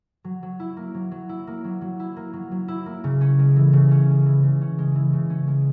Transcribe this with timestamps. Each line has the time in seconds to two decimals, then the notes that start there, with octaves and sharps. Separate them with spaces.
0.24 F#3
0.43 F#3
0.60 E4
0.77 A#3
0.94 F#3
1.12 F#3
1.29 E4
1.47 A#3
1.64 F#3
1.81 F#3
2.00 E4
2.17 A#3
2.33 F#3
2.51 F#3
2.68 E4
2.86 A#3
3.04 C#3
3.21 C#4
3.39 G#3
3.56 E3
3.73 C#3
3.91 C#4
4.09 G#3
4.26 E3
4.43 C#3
4.61 C#4
4.78 G#3
4.95 E3
5.13 C#3
5.30 C#4
5.48 G#3